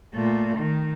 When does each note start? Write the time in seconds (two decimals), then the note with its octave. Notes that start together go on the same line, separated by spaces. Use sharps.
0.14 A#2 A3
0.57 D#3